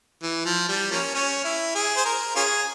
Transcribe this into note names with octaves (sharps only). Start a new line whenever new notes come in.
E3
F3
G3
F3 A#3 C#4
C#4
E4
G#4
C5
A#4
C#4 F4 G#4